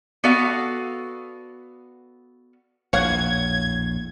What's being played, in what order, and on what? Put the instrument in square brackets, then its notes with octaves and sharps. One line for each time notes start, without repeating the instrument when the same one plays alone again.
[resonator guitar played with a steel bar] B3 F#4 A4 D5 F5
[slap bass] A#1 E2 A2 [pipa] C#5 F5 F#5 [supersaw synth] G#6